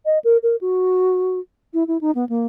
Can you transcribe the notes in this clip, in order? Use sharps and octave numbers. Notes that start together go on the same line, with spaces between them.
D#5
A#4
A#4
F#4
E4
E4
D#4
B3
A#3